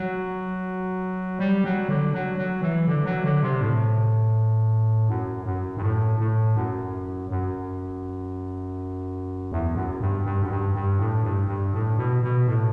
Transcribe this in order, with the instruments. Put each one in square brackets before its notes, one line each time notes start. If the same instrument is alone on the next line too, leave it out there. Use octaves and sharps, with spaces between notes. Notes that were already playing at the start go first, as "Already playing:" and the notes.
Already playing: [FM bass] F#3
G3
F#3
D3
F#3
F#3
E3
D3
F#3
D3
C3
A2
F#2
F#2
G2
A2
A2
F#2
F#2
E2
F#2
G2
G2
F#2
G2
G2
A2
G2
G2
A2
B2
B2
A2